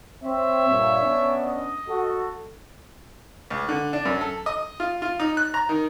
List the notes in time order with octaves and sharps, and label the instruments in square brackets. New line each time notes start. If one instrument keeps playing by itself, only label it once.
[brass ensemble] C4 [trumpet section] C#5 E5
[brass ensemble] G2 A#2
B3 C#4 D4
[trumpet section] D#5
[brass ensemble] F#4 A4
[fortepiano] C#2
D3
D4
F#2
A4
D#5
F4
F4
D#4
F#6
A#5
D#3